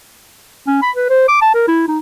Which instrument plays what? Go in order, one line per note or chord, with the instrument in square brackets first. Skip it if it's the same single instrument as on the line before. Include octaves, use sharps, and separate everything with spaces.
[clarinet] C#4
B5
B4
C5
D6
A5
A#4
E4
D#4